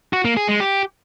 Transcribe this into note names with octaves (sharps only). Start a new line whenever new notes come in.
F#4
A#3
G#4
G#3
G4